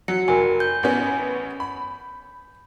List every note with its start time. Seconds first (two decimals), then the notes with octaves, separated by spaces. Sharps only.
0.08 F#3 F#4 C#7
0.28 F1 A#4 G#5
0.60 G6
0.83 A1 B3 C#4
1.60 B5